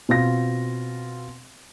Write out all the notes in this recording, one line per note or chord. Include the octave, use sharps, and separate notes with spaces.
B2 C4 F4 A#6